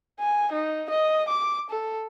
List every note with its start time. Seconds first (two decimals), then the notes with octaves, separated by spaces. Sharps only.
0.20 G#5
0.52 D#4
0.90 D#5
1.28 D6
1.70 A4